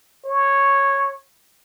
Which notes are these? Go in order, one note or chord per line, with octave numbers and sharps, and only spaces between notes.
C#5